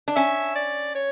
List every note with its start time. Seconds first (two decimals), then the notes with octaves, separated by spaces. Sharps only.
0.08 D4
0.16 C#4 E5
0.56 D5
0.95 C#5